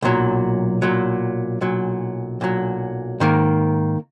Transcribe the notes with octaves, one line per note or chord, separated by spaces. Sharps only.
B1 A#2 F#3
B1 A#2 F#3
B1 A#2 F#3
B1 A#2 F#3
G#2 D#3 A#3